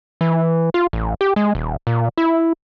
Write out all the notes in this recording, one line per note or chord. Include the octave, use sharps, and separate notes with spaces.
E3
F4
A1
G4
G#3
D#1
A#2
E4